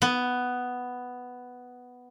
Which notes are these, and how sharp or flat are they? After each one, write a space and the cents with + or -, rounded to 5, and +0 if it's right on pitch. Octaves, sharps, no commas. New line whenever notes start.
B3 +5